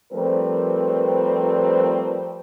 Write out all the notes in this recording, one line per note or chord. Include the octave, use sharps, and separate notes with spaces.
F3 G3 A3 C4 A#4 B4